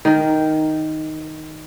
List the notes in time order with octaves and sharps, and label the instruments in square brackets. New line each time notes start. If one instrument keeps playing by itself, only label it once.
[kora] D#3 A#4